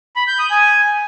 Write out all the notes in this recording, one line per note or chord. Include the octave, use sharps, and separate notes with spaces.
B5
G6
D#6
G#5